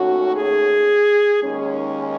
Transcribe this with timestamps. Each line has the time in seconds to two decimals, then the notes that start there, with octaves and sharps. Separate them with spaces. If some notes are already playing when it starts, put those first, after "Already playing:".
Already playing: D#2 D#3 A3 C#4 F#4
0.34 G#4
1.42 D#2 D#3 G#3 C#4